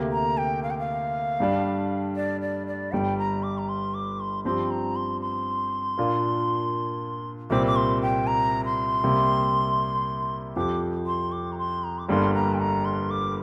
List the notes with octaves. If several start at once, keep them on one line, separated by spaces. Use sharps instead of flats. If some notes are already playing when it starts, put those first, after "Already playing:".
Already playing: D2 C3 A#3 G4
A#5
G5
F5
G5
F5
G2 G3 D4
D5
D5
D5
G1 G2 G3 G5
A#5
D6
A#5
C6
D6
C6
G2 F3 C4 G4 C6
A#5
C6
C6
A#2 A#3 D4 F4
C2 A#2 G3 C4 D6
D6
C6
G5
A#5
C6
C2 C3 G3 A#3
F2 F3 C4 G4 D6
C6
D6
A#5
C6
A#5
D6
G1 G2 D3 G3 A#3 C6
A#5
G5
A#5
C6
D6